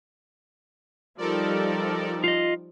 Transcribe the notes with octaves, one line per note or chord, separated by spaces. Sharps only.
F3 G3 D#4 A4 A#4 D5
F4 D#5